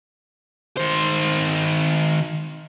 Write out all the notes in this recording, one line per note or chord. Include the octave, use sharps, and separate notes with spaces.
D#3 C5